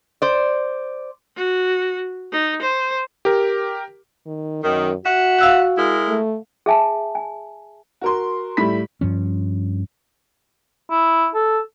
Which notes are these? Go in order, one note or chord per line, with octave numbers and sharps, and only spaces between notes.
C5 D5
F#4
D#4
C5
G4 A#4
D#3
F#2 D#3
F#4 E5 F#5
F5 E6 F#6
G#3 E4 A#4
A3
G#4 E5 G#5 A5
G#5
F#4 A#4 C6
A2 G3 E4 B5 B6
G2 F3 C#4
E4
A4